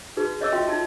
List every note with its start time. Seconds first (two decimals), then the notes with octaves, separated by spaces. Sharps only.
0.17 D#4 F#4 G#4 B4
0.41 C#5 D#5 E5 D6 E6
0.52 F4 F#4 D#5 E5 G5 C6
0.68 D#4 F4 A5